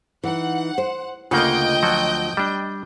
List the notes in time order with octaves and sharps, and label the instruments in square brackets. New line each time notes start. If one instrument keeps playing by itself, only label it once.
[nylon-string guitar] E3 D#4 [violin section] F#5
[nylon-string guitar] C5
[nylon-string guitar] D2 F4 F#5 [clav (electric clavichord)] C#3 A#3 [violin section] D#5 G5 G6
[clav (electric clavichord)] F3 F#3 F#4
G3 D4